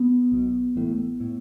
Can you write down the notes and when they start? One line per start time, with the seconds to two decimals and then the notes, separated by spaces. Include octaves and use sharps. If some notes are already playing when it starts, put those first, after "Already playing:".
Already playing: B3
0.32 B1 B2
0.75 A1 A2
1.20 A2